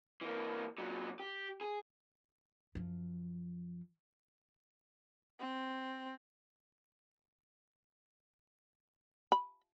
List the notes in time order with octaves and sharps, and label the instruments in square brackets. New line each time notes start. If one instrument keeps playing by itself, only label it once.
[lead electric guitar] E3 A#3
A#2 F#3
G4
G#4
[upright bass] F#2 F3
[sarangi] C4
[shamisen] B5